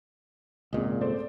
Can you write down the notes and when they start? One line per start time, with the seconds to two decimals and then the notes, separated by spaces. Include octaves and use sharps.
0.73 G#1 C#2 A#2 G#4 D#5
1.01 A3 C5 D5